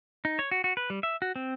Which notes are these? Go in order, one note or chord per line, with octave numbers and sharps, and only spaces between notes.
D#4
C#5
F#4
F#4
B4
G3
E5
F#4
C4